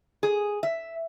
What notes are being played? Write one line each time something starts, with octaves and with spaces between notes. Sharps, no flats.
G#4
E5